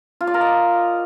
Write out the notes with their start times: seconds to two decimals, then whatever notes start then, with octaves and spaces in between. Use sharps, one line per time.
0.21 F4
0.27 D5
0.34 A#4
0.41 D#5